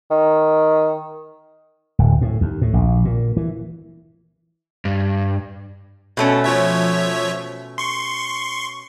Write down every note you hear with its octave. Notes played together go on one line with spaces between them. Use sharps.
D#3
D1
A2
D#2
A2
A#1
A#2
E3
G2
B2 A3 C#4
F3 C#5 E5
C6 C#6